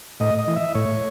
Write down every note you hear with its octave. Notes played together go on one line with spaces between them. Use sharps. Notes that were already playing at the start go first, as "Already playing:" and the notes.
A2 D#5
D#5
E3
E5
A2 C#5